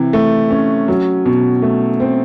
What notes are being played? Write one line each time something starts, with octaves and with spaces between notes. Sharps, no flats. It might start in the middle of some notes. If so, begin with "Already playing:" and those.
Already playing: C3 E3
A3
C#4
F#3
B2
A3
C4